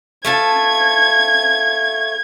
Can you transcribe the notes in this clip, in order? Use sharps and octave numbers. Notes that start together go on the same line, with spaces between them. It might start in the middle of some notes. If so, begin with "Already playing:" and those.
A3 F4 A5 G#6